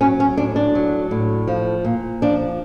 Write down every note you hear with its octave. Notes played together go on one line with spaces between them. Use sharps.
F#3 C#4
C#4
A2 D4
D4
F#3
A2
F3
A#2
F3 D4